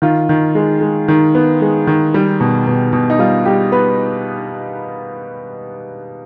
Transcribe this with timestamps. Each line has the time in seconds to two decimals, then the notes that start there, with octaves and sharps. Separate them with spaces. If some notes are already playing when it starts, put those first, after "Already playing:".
0.02 D#3 F4
0.29 D#3
0.55 G#3
0.81 G#3
1.08 D#3
1.35 B3
1.61 G#3
1.87 D#3
2.14 G3
2.41 B2
2.67 B2
2.93 B2
3.10 D#4
3.19 G3 F4
3.45 G3 G4
3.72 B3 B4